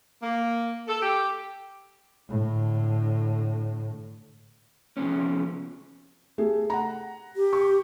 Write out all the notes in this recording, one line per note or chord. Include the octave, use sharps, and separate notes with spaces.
A#3
A4
G4
A2 D3
C3 F3 B3 C#4
A3 G4 G#4
F#5 A#5
G4
C#6